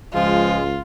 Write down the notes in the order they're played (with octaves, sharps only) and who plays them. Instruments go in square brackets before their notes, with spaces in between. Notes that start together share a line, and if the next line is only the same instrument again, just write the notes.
[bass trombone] C#2 [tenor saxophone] F3 [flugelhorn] G#3 [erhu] F4